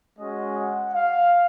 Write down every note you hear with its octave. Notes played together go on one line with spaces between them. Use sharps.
G#3 C#4 F#4 D#5
F#5
F5